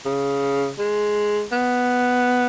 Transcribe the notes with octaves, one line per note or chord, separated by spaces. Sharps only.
C#3
G#3
B3